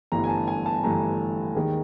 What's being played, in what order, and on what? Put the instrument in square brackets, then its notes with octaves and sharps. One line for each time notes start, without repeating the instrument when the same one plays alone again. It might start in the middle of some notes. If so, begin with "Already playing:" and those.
[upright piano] G1 G2 E3 A3 A#5
G#5
A5
G#5
A5
G1 G2 E3 A3 A#5
D#2 D#3 G#3